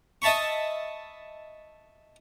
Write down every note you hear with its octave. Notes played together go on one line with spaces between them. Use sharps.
D#5 E5 A5 B5 C#6